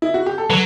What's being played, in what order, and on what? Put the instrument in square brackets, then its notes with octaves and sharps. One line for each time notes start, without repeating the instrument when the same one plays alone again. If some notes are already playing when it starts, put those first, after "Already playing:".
[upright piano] E4
F#4
G4
A4
[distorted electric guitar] F#3 [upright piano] B4